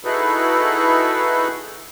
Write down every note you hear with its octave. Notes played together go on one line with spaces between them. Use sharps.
D#4 E4 F#4 G#4 A4 B4